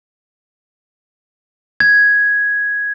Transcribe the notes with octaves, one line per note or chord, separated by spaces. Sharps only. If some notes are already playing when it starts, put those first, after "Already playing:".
G#6